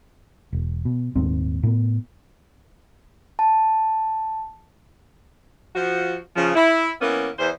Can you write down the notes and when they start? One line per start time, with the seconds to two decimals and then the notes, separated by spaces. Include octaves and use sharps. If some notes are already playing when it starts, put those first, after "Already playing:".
0.53 E1
0.85 B2
1.16 D#1 D#2 G#2 C4
1.63 A2 B3
3.39 A5
5.75 F3 F#4
6.36 C#3 F3
6.55 E4
7.01 E3 A#3 B3 C#4
7.38 E2 C5